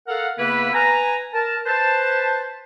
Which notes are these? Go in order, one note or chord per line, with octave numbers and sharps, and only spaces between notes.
A4 A#4 F5 F#5
C#3 A#3 B3 E4 B4
B4 G#5 A#5
A#4 A5
B4 C5 A5